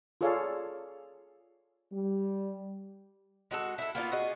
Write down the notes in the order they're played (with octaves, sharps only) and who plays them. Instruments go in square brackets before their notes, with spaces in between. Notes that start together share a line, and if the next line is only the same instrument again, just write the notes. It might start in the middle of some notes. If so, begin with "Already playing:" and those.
[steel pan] F4 G#4 A4 C#5 D5 F5
[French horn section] G3
[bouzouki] G#3 F#4 A4
E4 A4
A#3 B3 E4 F4
F#4 G#4 D#5